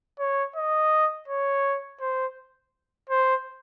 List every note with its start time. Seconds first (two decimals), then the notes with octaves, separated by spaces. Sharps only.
0.19 C#5
0.56 D#5
1.28 C#5
2.01 C5
3.09 C5